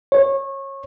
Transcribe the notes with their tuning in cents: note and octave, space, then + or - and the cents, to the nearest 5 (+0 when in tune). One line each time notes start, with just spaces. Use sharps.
C#5 -25